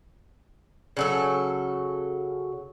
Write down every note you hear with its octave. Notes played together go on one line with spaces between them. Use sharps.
C#3 F#3 A4